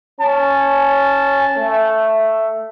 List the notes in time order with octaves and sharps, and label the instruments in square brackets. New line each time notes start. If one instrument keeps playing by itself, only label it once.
[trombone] C#4 [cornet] A5
[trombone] A3